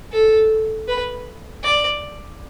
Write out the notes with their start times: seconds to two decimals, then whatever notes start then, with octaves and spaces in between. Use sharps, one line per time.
0.12 A4
0.88 B4
1.64 D5